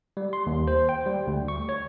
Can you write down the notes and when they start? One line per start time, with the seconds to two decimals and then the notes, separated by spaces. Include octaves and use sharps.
0.17 G3
0.33 C6
0.47 D#2
0.67 C5
0.89 G5
1.06 G3
1.27 D2
1.48 C#6
1.69 C#5